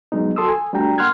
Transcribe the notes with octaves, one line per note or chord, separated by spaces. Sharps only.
F#3 G#3 B3 D#4
F#4 A4 C6 D#6 E6
G#5
G3 A3 D4 F#4 G5 A#5
A#3 F#5 C6 F6 F#6 G#6